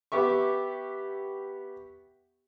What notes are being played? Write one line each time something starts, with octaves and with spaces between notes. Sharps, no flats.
B3 G4 E5 C#6